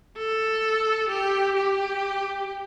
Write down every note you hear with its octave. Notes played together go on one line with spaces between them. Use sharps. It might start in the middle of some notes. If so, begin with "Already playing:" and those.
A4
G4
G4